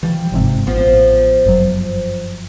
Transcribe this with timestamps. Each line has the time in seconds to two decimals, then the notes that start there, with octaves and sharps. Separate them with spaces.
0.03 E3 F3 G3
0.32 G1 G#2 C3
0.67 A1 F3 B3
1.45 G1 F#2 F#3